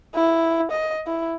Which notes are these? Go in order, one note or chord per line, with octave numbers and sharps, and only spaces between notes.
E4
D#5
E4